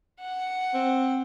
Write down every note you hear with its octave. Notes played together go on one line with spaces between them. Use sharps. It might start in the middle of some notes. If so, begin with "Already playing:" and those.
F#5
C4